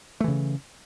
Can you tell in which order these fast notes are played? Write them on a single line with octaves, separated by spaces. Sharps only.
A3 E3 C#3